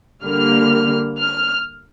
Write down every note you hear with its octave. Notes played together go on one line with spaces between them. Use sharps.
D3 G3 A#3 F6
F6